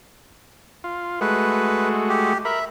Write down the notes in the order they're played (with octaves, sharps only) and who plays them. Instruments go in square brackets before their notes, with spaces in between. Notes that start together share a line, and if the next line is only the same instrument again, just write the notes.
[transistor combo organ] F4
[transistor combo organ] G#3 A3 F#4 [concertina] B4
[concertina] G4
[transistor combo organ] A#4 B5 [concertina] E5